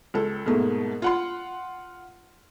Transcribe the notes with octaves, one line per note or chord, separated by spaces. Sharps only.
C#2 A4
G#2 B2 A3 A#3
F4 F#5 C6